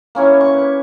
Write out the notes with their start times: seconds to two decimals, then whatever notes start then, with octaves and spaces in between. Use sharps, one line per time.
0.15 A#3 C#4 E4 C#5
0.41 C#6
0.54 B4